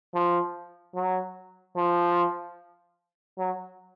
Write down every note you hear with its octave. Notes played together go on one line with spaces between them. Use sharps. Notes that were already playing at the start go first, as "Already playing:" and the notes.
F3
F#3
F3
F#3